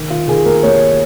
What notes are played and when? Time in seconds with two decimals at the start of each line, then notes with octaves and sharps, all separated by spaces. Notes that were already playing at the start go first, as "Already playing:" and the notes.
Already playing: D#3
0.10 D#3 F4
0.28 D#3 G#4
0.45 D#2 A#4
0.63 D#2 C#5